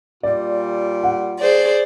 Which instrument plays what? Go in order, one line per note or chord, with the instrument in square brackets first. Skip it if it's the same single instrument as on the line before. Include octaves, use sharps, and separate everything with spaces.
[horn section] A#2 G3 F4 [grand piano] D5
[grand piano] F#5
[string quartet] G#4 C5 D5